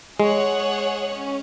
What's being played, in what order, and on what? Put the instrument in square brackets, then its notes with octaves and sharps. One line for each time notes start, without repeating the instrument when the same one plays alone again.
[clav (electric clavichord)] G#3 [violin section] G#4 C#5 F#5
[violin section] C#4